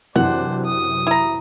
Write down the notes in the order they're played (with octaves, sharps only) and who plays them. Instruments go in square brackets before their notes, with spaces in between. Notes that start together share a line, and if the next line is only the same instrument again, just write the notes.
[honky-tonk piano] F#2 C3 E3 [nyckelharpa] D4 C5 [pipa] F#5
[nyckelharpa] D#6
[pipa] E4 A#5